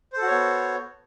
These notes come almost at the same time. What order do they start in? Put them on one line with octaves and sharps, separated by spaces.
C5 A4 F#4 C#5 B3